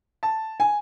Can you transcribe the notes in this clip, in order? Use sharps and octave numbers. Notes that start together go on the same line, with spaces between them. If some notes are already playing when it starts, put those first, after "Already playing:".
A5
G#5